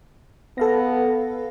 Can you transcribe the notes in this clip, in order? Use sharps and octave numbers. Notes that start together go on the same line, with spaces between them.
B3 A4 F5 A#6